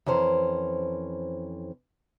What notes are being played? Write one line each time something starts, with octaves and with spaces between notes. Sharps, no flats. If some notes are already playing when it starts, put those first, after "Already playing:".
F2 E3 C#4 C5 A#5